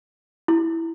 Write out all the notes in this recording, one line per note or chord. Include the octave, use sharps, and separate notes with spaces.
E4